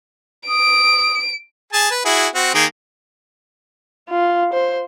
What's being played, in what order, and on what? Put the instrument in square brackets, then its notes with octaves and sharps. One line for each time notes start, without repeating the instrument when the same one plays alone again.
[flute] D#6 [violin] D7
[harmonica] G#4 G#5 A5
B4
E4 F#4 G#4
C4 F#4
D#3 A#3 G#4
[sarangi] F4
C5